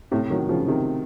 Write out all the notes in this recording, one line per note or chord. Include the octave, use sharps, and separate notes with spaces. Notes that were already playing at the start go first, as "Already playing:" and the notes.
A2 C3
D#3 F#3
C#3 F3
C3 D#3